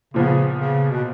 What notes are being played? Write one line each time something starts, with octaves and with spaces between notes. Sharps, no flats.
A#2 C#3 F3 B3
C#3
B2